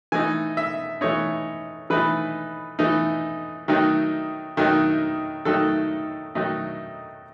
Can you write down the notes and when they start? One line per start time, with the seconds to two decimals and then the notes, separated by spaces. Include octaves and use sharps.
0.12 E3 A3 D#4 G#5
0.57 E5
1.01 E3 A3 D#4 C#5
1.90 E3 A3 D#4 B4
2.79 E3 A3 D#4
3.68 D#3 F#3 A3 D#4
4.57 D#3 F#3 A3 D#4
5.45 D#3 F#3 A3 D#4 A4
6.35 D#3 F#3 A3 D#4